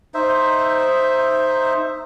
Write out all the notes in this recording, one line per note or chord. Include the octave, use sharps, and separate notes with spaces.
D#4 C5 E5